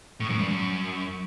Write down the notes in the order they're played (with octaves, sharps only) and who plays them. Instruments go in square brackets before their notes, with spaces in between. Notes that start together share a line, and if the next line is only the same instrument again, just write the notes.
[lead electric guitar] A2
F#2
G2
F#2